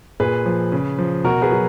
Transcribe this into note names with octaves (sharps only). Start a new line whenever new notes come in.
A#2 G#4 B4
F3
C#3
F3
B2 F#4 A#4
G#4 B4
F#3